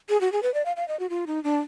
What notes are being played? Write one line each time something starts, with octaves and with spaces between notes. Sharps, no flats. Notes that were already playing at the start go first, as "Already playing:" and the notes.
G#4
F#4
G#4
B4
D5
F5
F5
D#5
F#4
F4
D#4
D4